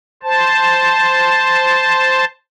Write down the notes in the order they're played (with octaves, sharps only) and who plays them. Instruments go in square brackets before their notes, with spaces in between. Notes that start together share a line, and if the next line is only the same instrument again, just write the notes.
[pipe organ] C5 A5